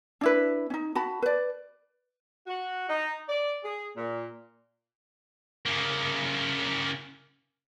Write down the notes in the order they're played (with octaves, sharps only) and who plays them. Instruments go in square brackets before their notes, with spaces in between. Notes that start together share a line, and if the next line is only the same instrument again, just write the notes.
[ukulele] D4 E4 B4
C#4 D#4
F#4 A5 B5
B4 D5
[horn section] F#4
D#4
D5
G#4
A#2
[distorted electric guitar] C#3 A#3